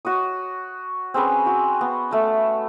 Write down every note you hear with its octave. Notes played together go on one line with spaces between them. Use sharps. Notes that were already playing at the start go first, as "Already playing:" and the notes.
F#4 C#5 D#6
C4 C#4 G#4 B4
F#4
B3
A3 A5